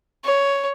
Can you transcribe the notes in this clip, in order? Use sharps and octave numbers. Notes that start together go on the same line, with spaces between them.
C#5